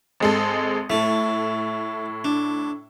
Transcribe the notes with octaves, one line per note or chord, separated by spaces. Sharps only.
G#1 G#3 A4
A2 A3 A4
D4